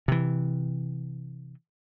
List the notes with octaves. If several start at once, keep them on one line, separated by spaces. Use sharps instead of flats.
C3 E3